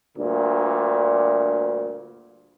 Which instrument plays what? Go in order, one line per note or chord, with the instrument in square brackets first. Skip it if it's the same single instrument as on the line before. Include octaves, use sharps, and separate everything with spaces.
[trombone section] D2 G2 A#2